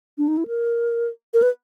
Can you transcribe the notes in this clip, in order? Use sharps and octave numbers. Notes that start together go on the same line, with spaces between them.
D4
D#4
E4
A#4
A#4
B4